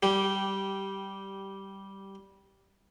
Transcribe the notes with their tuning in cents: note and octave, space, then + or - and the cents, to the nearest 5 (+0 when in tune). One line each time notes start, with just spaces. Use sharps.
G3 -5 G4 -15